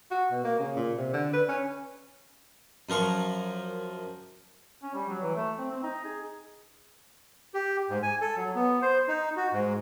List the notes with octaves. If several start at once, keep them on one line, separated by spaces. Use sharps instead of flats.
F#4
B2
A#3
C#3
A#2
C3
D3
B4
C#4
F#2 F3 A#4 C#6
C#4
G3
F#3
E3
A3
C4
C4
D#4
G#4
G4
G#2
G#5
A4
F#3
B3
C5
D#4
F#4
G#2